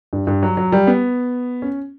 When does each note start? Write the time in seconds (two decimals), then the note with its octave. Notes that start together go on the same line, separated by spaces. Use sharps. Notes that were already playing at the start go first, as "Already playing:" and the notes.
0.13 G2
0.27 G2
0.43 F#3
0.57 F#3
0.72 G3
0.87 B3
1.62 C#4